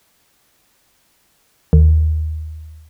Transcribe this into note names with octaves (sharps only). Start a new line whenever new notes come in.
D#2